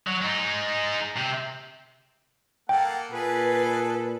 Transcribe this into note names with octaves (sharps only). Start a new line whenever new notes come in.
F#3
G#3 D#4
C3 C4
A#3 A4 F#5 G5
A#2 G#4 A4 B4